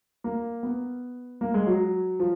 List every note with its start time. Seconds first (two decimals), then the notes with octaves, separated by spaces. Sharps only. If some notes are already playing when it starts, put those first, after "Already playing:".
0.24 A#3
0.63 B3
1.41 A#3
1.54 G#3
1.67 F#3
2.20 F3